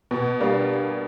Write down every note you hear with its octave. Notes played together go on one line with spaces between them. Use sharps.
B2
G3 A#3 D4